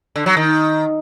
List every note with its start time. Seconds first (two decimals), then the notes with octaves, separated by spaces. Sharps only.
0.16 D3
0.26 F#3
0.37 D#3